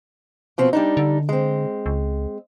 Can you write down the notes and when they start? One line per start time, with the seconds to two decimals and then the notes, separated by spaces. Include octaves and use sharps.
0.58 B2 F3 C4
0.73 G3 D4 D#4
0.97 D3
1.29 G#3 C4
1.86 C#2